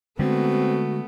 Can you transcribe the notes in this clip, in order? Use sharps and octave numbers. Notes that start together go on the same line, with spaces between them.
D3 G#3 A3 B3 C4 F#4